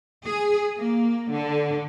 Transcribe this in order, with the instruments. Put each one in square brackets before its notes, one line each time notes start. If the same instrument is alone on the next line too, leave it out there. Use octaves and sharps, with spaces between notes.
[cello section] G#4
A#3
D3